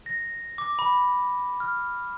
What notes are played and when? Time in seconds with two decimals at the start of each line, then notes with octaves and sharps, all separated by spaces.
0.06 A#6
0.58 D6
0.79 B5
1.60 F6